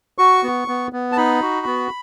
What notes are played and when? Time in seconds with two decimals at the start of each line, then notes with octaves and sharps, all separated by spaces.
0.18 F#4 C#6
0.43 B3
0.68 B3
0.93 B3
1.12 A5
1.17 D#4 B5
1.42 F#4
1.66 B3